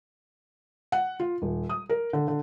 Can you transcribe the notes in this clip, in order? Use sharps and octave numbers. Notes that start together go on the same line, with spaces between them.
F#5
F4
D#1
D#6
A#4
D3
D3